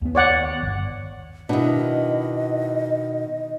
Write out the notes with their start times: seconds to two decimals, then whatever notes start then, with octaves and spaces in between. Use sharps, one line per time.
0.02 D#2 B3
0.15 C#5 D5 F#5
0.63 G1
1.49 B2 D#3 D4 E4 D#5